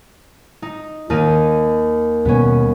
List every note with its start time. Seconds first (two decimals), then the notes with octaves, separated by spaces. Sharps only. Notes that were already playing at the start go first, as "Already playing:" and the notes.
0.62 D#4
1.10 D#2 D#4 D#7
2.25 D#2 B2 G3 B3 C#4